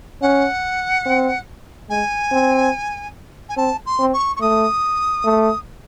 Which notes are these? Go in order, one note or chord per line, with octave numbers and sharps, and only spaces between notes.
C#4 F#5
C4
G#3 G#5
C4
G#5
C4 A5
C6
C4
C#6
C#6
A3 D#6
A3